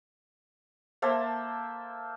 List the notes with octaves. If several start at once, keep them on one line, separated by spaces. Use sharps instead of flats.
A#3 C5 E5 A5